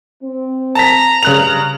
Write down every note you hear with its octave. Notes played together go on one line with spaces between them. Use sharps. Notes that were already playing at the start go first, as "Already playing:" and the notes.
C4
A5 A#5 B6
G2 C#3 F#6 F7